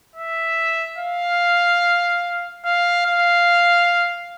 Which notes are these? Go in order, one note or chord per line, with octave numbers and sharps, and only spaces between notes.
E5
F5
F5
F5